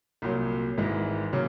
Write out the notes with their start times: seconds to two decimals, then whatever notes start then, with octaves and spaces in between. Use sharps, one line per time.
0.22 C2 A#2 F#3
0.77 G#1 G#2 E3 G#3
1.33 C#3 F#3 A#3